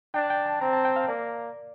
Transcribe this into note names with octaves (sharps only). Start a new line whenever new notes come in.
D4 G5
G5
A5
C4 A#5
A5
G5
F5
A#3 D5